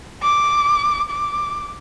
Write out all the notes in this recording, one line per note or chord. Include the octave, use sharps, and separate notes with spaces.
D6
D6